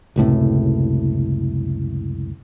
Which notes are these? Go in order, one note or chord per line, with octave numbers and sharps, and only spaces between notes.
F#1 C#2 A2 C3